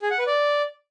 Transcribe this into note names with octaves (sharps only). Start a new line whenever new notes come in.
G#4
F#5
B4
D5